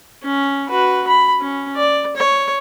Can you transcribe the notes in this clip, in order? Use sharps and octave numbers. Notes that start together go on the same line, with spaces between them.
C#4
F#4 B4
B5
C#4
D5
C#5